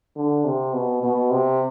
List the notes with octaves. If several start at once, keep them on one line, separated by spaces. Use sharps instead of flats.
D3
C3
B2
B2
C3